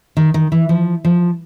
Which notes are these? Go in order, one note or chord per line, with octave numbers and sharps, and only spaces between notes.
D#3
D#3
E3
F3
F3